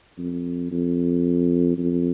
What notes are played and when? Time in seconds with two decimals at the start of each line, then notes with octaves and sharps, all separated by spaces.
0.19 F2
0.72 F2
1.78 F2